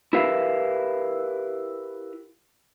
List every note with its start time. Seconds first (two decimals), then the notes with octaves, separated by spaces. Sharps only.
0.13 E4 G4 A#4 B4 E5 F5